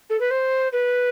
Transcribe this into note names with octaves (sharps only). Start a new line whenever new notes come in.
A4
B4
C5
B4